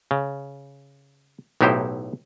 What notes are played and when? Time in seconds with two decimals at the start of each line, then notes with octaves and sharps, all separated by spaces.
0.11 C#3
1.61 B1 A2 D#4 E4 G4 C5